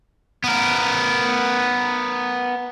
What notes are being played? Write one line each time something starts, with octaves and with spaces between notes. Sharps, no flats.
B3 A#4